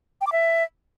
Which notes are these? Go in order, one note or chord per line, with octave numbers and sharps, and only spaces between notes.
G5
D6
E5